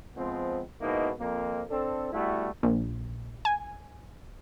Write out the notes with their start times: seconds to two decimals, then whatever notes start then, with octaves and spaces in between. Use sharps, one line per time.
0.16 F3 G#3 B3 C4
0.80 G#2 B2 A#3 D#4 E4
1.18 F2 A#3
1.69 C4 D4 A4
2.12 G3 A3 B3 E4 F#4
2.63 A#1
3.45 G#5